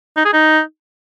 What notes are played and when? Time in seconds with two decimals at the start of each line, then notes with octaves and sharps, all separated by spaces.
0.17 D#4
0.25 G#4
0.33 D#4